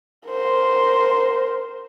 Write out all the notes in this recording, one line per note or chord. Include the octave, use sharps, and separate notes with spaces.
A#4 C5